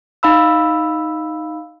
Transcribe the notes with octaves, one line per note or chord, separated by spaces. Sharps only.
D#4 F5 B5 E6